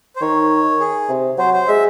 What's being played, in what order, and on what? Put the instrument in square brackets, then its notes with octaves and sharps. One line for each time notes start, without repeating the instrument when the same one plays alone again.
[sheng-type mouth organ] C5
[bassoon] D#3 [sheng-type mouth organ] C#5
[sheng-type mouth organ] G#4
[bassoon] C3
[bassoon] F#3 [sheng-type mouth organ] C5
[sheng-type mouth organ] C5
[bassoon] G#3 [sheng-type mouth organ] E5